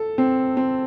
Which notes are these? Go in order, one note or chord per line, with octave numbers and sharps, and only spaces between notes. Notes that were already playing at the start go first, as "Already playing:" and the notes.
Already playing: A4
C4
C4